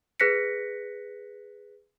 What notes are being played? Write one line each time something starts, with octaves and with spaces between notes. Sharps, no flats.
G#4 B4 F#6 A#6 B6 C#7